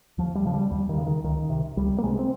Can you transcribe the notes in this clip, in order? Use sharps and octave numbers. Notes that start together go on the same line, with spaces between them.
D#2 F3
G3
C#3 F3
G3
D#2 G3
D#3
C#3
D#3
C#2 D#3
C3
C#2 G3
A#3
C3 G#3
C4